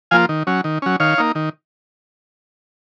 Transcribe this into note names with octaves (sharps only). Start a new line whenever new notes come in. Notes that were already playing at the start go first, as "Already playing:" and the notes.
F3 A#3 F4 F5 G#5
D#3
F#3 C#4
D#3
F#3 C#4
D#3 C#5 F5
A#3 D#4
D#3